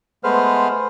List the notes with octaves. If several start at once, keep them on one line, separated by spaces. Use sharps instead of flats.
G#3 A3 B3 B4 C5 F6